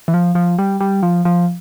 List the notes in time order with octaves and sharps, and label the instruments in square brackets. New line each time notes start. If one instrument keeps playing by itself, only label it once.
[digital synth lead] E3
F3
F3
G3
G3
F3
F3